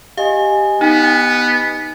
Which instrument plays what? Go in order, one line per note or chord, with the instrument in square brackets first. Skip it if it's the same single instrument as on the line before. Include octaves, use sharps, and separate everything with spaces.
[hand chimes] G4 D#5 G#5 [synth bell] F5
[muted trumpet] B3 [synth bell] D#4